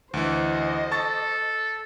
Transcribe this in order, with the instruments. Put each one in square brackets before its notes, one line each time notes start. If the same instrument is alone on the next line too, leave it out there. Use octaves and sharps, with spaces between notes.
[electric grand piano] D2 E3 [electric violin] C5 D#5
[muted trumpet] A4 [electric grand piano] A5 C#6 A6